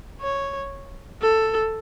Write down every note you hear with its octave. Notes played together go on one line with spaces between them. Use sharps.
C#5
A4